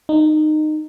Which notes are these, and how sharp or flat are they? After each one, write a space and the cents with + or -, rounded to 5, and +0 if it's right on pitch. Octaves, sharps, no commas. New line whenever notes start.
D#4 -20